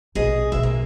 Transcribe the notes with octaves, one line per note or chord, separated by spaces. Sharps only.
A#1 B2 G#4 D#5
B1 B2 E5
A#3